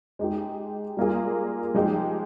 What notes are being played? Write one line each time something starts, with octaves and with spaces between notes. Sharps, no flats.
G#3 D#4 G4
G3 A#3 F4 G#4
F3 G#3 D#4 G4